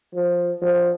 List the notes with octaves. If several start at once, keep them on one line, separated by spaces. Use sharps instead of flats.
F3
F3